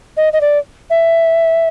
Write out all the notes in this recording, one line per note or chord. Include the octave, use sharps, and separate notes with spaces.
D#5
D#5
D5
E5